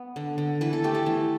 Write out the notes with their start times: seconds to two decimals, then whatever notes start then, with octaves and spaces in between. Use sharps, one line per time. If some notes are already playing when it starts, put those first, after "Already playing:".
Already playing: B3
0.16 D3
0.38 D3
0.61 E3 B4
0.73 A4
0.84 A3 G4
0.95 A4
1.06 E3